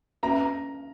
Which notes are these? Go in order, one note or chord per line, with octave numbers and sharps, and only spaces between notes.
A#3 C#4 F#4 B4 E5 A#5
A#5